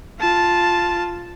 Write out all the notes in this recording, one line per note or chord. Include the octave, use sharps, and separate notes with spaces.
F4 A5